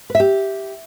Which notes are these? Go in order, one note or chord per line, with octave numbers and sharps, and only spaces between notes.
B4
E5
G4